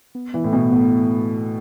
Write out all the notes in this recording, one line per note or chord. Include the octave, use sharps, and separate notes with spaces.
B3
E3 B3
A2
B2 B3
A2 B3